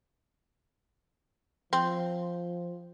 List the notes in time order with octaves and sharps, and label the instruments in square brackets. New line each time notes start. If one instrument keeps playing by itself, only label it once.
[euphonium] F3 [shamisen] C4